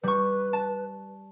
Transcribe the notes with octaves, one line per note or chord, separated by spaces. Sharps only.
G3 B4 C#6
A5